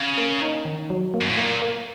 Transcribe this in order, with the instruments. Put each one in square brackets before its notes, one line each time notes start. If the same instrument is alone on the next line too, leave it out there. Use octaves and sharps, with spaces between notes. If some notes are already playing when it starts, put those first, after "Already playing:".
Already playing: [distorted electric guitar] C#3
[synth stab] A#3
D#4
D#3
F#3
A#3
[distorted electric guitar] F#2
A2
[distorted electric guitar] A#2 [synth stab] A#3
[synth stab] A#3